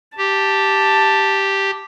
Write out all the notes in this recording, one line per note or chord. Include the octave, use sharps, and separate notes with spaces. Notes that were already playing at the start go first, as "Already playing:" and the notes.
G4 A5